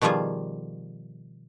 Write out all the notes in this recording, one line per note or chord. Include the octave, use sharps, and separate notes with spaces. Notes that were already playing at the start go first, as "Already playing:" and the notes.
B2 D#3 F3 G3 F4 G#4